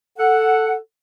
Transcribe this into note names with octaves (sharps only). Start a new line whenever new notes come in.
A4 F#5